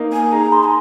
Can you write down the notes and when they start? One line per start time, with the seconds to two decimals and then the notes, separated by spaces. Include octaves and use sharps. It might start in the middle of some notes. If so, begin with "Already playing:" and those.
Already playing: A#3 D#4
0.13 G#5
0.32 D#4 G#4 A#5
0.52 C6
0.64 G#5